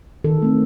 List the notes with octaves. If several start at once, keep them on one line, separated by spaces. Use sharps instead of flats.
D#3 A4
A3 C4